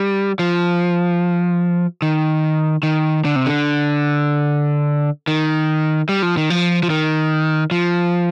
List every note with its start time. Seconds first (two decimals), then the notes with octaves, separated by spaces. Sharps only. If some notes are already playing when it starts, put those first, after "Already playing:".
Already playing: G3
0.39 F3
2.02 D#3
2.83 D#3
3.25 D3
3.36 C3
3.46 D3
5.27 D#3
6.09 G3
6.22 F3
6.37 D#3
6.50 F3
6.83 F3
6.90 D#3
7.71 F3